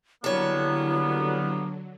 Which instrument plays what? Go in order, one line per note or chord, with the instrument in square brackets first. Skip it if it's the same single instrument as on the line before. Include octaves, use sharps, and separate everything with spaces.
[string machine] D3 F#3 [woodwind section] G3 A#3 B3 [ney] E4 [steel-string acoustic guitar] A4 C#5